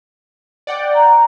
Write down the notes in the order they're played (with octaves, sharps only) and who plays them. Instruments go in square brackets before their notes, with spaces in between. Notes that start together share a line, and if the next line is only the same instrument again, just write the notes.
[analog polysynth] D5 F#5 G5
[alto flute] A#5